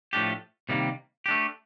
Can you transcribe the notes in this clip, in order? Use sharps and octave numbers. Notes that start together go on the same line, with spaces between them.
A2 F3 A3 D4 G4
C3 D#3 G3 A#3
A3 D4 G4